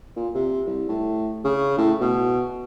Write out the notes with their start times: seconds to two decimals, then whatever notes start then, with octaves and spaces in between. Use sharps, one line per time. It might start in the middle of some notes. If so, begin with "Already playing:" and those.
0.16 A#2
0.35 C3
0.67 C2
0.89 A2
1.44 C#3
1.78 A2
2.00 B2